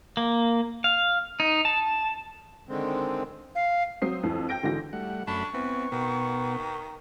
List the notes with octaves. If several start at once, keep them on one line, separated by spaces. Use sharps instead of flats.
A#3
F5
D#4
A5
D3 D#3 G#3 C4
F5
F#3 C4 D#6 C7
F2 E3
G5 G6 A#6 D7
G#1 D3 E3 F#4 A#6
G3 A3 F#5
F#2 A3 D4 B5 C#6
E3 B3 C4
B2 D#3 B3